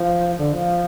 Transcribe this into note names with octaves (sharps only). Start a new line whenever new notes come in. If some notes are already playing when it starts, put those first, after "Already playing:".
Already playing: F3
D3
F3